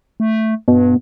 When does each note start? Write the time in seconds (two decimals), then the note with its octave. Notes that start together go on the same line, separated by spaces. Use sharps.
0.20 A3
0.68 G2 B2